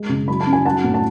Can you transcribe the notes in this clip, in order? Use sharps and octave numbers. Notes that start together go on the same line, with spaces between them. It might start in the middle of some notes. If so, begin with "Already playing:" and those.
Already playing: G#3
C#3
F#3 B5
A5
C#4
G#5
F#3 F#5 A5
A2
A5